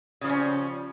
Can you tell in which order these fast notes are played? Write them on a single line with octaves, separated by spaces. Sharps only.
C#3 F3 G3 C#4